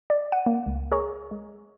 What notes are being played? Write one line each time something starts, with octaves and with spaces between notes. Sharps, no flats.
D5
F#5 D#7
A#3
C#2
G#4 A#4 C#5 A#5 C#6
G#3